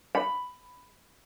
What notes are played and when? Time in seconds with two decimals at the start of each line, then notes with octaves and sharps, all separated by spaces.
0.15 B5